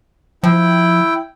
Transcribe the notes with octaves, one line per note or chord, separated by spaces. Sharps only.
F3 E4 G5